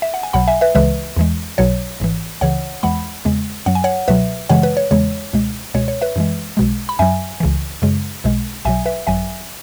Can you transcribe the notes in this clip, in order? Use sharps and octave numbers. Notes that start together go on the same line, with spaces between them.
E5
F#5
G#5
B1 B2 F#3 F#5 B5
E5 G#5
B4 E5
C#2 C#3 E3 G#3 B4 E5
E2 E3 G#3
B1 B2 F#3 C#5
G#1 G#2 E3
C#2 C#3 E3 C#5 F#5
E2 E3 G#3 F#5 B5
E2 C#3 G#3
F#2 F#3 F#5
G#5
C#5 F#5
C#2 B2 F#3 B4 E5
F#2 C#3 E3 G#3 C#5 F#5
B4
C#5
E2 C#3 E3 G#3 C#5
C#2 B2 G#3
C#2 B2 G#3 C#5
C#5
B4 E5
F#2 E3 G#3
B1 B2 G#3
B5
F#2 F#3 E5 G#5
C#2 C#3 E3
F#2 C#3 G#3
B1 B2 G#3
B1 B2 F#3 E5 G#5
B4 E5
G#1 F#2 F#3 E5 G#5